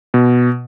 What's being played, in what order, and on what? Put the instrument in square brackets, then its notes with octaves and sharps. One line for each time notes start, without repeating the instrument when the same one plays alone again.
[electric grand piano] B2